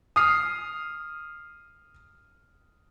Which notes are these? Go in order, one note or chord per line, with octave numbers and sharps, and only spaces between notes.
D#6 F6 C7